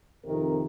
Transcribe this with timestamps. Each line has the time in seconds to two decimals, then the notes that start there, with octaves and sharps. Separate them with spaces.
0.24 F2 C3 D#3 A#4